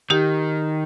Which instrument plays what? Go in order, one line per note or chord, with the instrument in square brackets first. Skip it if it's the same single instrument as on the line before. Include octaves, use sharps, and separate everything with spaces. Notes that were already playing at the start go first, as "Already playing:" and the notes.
[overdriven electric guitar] D#3 [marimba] D#4 G4